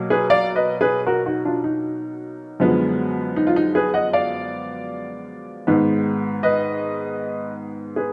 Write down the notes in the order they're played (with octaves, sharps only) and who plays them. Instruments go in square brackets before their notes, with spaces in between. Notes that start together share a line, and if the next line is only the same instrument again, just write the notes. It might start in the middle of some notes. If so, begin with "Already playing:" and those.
Already playing: [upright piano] B2 F#3 A#3
G#4 B4
D5 F5
B4 D#5
G#4 B4
F#4 A#4
D#4 F#4
D4 F4
D#4
F#2 D3 F3 G#3 B3
D#4
F4
D#4
G#4 B4
D#5 F#5
D5 F5
G#2 D#3 G#3 B3
B4 D#5
G#4 B4